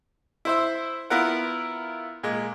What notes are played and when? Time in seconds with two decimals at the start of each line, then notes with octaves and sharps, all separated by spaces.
0.45 E4 C5 E5
1.10 B3 E4 F4 A#4 F5 F#5
2.23 A#2 G#3